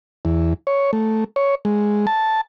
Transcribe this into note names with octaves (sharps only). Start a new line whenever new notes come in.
E2
C#5
A3
C#5
G#3
A5